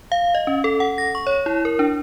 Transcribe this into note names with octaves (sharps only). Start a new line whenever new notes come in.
F5
D#5
C#4
A4
F#5
A#6
C#6
C#5
E4
A#4
D4